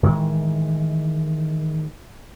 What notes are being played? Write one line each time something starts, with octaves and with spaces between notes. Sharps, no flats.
A2 D#3 E3 G#3